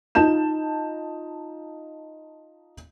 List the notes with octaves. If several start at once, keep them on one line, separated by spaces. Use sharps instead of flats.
D#4 F4 A5 G6 E7